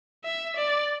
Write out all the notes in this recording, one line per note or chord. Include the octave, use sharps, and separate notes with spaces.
E5
D5